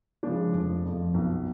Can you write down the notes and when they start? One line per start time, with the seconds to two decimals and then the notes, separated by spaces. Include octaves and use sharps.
0.23 C#3 F3 G#3 D4
0.54 F1
0.84 F2 F3
1.14 B1